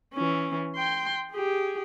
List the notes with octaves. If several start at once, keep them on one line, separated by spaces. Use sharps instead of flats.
E3 C#4
G5 C6
G4 G#4